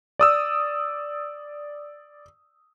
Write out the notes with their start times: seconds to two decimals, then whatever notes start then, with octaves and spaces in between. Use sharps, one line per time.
0.19 D5 D#6 E6